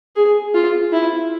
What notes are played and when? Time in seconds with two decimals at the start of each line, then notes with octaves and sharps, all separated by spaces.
0.16 G#4
0.54 F4
0.92 E4